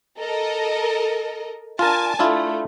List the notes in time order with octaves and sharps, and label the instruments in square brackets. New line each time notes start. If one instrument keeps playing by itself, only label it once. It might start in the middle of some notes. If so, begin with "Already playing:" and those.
[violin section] A4 A#4 D#5
[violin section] D4 G#5 A5 [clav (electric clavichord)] F4 A#4
[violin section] A3 [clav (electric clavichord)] D4 E4 F4